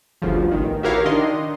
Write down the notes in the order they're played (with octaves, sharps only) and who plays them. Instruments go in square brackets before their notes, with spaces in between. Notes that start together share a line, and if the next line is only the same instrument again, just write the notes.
[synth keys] G1 D2 C#3 F3
A1 D#3
E4 F#4 G4 A#4 C#5 F5
D#3 D4 D#5 C6